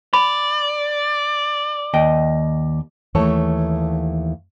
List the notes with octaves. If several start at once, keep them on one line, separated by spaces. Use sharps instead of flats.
D5 B5
D#2 D#5 G5
D#2 E3 A3 C#5 A5